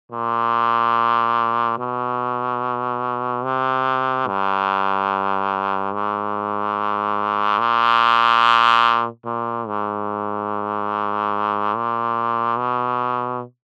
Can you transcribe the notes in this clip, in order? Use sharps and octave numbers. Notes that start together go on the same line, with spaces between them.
A#2
B2
C3
G2
G#2
A#2
A#2
G#2
A#2
B2